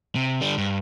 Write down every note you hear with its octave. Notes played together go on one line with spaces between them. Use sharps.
C3
D3 G3
G2